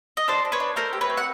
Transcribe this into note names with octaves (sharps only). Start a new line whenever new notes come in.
D#5
D4 C5 D5
D4
B4 C#5
D4
A3 A#4 C5
G4
B4 C#5
C4
F#5